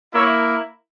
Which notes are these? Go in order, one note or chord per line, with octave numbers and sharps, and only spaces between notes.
A#3 E4 C#5 E5